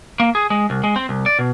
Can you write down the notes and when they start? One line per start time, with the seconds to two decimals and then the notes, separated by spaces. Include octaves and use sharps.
0.20 A#3
0.35 G#4
0.50 G#3
0.70 C2
0.84 G#3
0.96 C4
1.09 C2
1.26 D5
1.39 B2